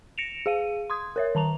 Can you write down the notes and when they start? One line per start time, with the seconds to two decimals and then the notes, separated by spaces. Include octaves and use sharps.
0.18 A#6 C#7 D7 E7 F7
0.46 G#4 F5 D#7
0.90 C6 D#6 G#6
1.16 A#4 C#5 E5
1.35 D#3 A5 A#5 F7